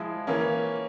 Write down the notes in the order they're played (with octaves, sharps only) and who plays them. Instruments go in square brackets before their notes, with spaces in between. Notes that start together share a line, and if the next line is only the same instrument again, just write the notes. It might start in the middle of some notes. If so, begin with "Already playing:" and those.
Already playing: [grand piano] F3 G#3 E4
E3 A#3 C#4